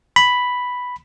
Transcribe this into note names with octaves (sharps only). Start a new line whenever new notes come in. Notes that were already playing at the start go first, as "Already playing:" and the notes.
B5